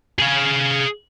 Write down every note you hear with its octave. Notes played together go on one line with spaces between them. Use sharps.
G#4 F5